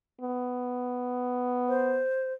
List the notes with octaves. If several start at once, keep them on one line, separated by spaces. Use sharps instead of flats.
B3
C5